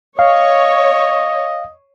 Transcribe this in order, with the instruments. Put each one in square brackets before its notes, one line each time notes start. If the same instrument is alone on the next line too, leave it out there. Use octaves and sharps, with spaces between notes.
[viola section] C#5 [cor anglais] D#5 [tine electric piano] F5